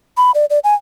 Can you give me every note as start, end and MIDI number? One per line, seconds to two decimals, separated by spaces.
0.17 0.31 83
0.34 0.45 74
0.50 0.59 74
0.64 0.74 80